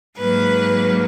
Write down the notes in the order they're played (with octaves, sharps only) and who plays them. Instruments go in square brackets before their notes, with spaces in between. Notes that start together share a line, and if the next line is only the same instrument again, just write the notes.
[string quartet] G#2 F#3 A#3 B4